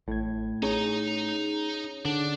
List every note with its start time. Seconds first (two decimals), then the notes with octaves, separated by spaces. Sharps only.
0.08 A1 A2 G#6
0.63 C#4 D#4 G#4 C#5 A#5
2.05 D3 D4